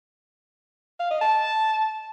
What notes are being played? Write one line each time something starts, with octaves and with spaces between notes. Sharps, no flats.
F5
D#5
A5